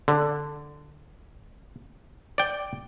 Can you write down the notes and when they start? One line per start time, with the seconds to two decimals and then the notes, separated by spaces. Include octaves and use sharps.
0.08 D3
2.38 D5 G5